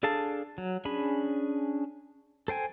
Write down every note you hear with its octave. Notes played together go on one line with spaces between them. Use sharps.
D4 G#4 A4 F5 A5
F#3
C#4 D4 G#4 B5
A4 C5 G5 G#5